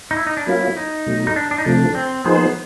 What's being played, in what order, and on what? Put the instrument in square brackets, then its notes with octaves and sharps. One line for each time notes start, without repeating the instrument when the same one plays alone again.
[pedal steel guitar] D#4
E4
D#4
D4
[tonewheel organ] F#3 A#3 C#4 F4 [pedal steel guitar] E4
[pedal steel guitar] D#4
[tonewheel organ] B2 F#3 A3
[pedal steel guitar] D#4
D4
D4
D#4
[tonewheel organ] C3 F3 A3 [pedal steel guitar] D4
[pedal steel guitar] C4
[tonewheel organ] F3 A#3 D#4 G#4 C5 [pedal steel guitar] B3